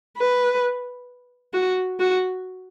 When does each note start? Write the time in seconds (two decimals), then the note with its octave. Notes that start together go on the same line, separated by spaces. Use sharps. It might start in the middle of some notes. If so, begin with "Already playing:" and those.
0.17 B4
1.53 F#4
2.00 F#4